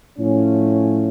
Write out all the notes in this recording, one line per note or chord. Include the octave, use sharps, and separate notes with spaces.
A2 F3 A3 C#4